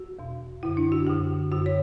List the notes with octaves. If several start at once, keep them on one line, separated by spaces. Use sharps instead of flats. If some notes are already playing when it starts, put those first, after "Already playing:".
Already playing: F#4
E2 B2
F#2 D3 E4
D4
F#4
F#2 D3 G4
F#2 D3 F#4
C#5